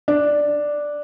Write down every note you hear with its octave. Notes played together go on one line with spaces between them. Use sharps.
D4